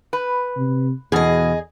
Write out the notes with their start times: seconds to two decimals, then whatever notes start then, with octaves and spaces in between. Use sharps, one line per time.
0.13 B4
0.57 C3
1.12 E2 B2 E3 G#4 D#5